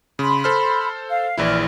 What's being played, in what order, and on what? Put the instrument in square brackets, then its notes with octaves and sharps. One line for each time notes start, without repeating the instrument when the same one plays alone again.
[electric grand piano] C#3 [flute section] B5 C6
[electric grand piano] A4 C5 F6
[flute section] F5
[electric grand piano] A#1 E3 E4 [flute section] G#4 D5 F6